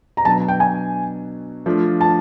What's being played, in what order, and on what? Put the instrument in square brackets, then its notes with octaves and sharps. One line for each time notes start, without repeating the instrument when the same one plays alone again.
[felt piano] A#5
[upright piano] B2 F#3 B3 D4 [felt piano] A5
[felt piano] G5
G#5
[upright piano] F3 A3 D4 F4
[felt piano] A5